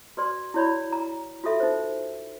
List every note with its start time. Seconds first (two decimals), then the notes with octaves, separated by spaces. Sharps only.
0.17 F#4 B4 D5 C6
0.54 E4 F#4 C#5 D5 B5
0.92 A#5
1.44 F4 F#4 A4 E5
1.60 D#4 C5